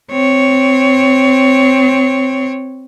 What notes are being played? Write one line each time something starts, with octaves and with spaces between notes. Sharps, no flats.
C4 C#5